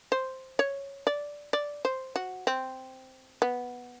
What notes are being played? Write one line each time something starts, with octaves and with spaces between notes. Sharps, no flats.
C5
C#5
D5
D5
C5
F#4
C4
B3